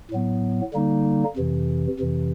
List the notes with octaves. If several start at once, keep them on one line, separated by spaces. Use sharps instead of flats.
A2 F#3 B3
D3 G3 A#3 D#4
F2 C3 E3
F2 C3 E3